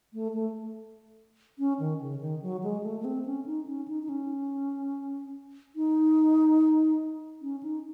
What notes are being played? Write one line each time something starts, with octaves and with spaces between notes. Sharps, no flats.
A3
A3
C#4
D#3
C#3
D#3
F#3
G#3
A3
A3
C4
C#4
D#4
C#4
D#4
D#4
C#4
D#4
C#4
D#4